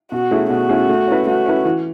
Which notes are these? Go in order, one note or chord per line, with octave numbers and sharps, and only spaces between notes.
B2 F#4
A3 C#4 E4 G#4
B2 F#4
A3 C#4 E4 G#4
A3
C#4 E4 B4
A3 F#4
C#4 E4 B4
E3